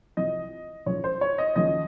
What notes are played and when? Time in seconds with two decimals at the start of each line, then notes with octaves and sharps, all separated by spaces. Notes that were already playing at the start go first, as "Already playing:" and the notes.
0.17 C2 C3 F3 D#5
0.86 C#2 C#3 F3 C#5
1.04 C5
1.21 C#5
1.38 D#5
1.56 D#2 C#3 F3 D#5